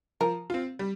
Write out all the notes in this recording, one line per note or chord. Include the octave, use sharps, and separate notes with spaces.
F3 A#4
C4 F4
G3